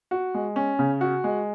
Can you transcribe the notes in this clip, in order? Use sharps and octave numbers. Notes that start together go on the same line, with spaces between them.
F#4
G#3
C#4
C#3
F#4
G#3